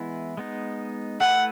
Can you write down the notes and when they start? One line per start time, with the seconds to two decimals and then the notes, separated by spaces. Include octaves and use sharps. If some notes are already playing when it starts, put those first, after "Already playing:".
Already playing: E3 G#3 B3 E4
0.37 G#3 B3 D#4
1.21 A3 E4 B4 F#5